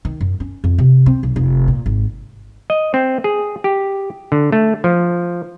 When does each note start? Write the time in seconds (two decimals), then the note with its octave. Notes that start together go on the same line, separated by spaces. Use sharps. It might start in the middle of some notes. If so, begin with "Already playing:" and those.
0.05 D#3
0.21 F#2
0.40 C#4
0.64 F2
0.78 C3
1.06 C4
1.23 B1
1.36 F1
1.68 A#2
1.86 G#1
2.70 D#5
2.94 C4
3.24 G#4
3.64 G4
4.32 D3
4.52 A3
4.84 F3